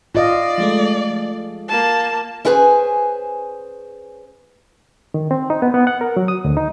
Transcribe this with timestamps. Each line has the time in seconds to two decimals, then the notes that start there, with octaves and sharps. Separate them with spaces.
0.15 F4 D5 D#5 F5
0.58 F3 G#3 A3
1.68 A#3 A5
2.45 C#4 E4 G#4 B4 C5 G#5
5.14 D#3
5.31 C4
5.50 D#4
5.62 B3
5.74 B3
5.87 F#5
6.01 A#4
6.17 F#3
6.28 D#6
6.45 D2
6.57 D#4